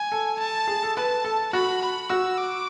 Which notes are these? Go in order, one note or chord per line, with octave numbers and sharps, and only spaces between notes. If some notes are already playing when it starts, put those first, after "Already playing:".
Already playing: G#5
A4
A5
G#4
A4
B4 A5
A4
F#4 B5
B5
F#4 E6
D6